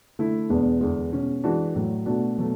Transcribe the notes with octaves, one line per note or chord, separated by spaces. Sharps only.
D3 A3 E4
E2 B2 G#3 B3 D4
E2 D3 G#3
B2 G#3 C#4
E3 G#3 D4 F#4
A2 F#3 A3
B2 A3 D4 F#4
B2 F#3 A3